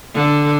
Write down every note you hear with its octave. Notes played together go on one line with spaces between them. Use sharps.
D3